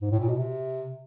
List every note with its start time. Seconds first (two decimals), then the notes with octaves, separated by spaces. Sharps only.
0.02 G#2
0.11 A2
0.19 A#2
0.29 B2
0.37 C3